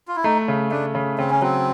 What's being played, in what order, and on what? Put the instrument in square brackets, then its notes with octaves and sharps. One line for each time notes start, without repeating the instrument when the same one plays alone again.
[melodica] F4
E4
[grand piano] A3 [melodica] D#4
[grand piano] C#3
[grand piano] A3 [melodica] D4
[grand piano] C#3
[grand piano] C#3 [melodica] C4
[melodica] C#4
[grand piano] F#3 [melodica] C4